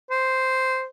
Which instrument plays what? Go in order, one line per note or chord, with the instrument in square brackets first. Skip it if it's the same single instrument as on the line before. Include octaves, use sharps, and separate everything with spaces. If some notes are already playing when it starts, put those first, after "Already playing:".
[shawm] C5